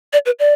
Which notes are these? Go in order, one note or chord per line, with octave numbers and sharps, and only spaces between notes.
D5
B4
D5